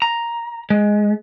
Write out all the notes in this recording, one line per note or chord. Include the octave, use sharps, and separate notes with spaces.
A#5
G#3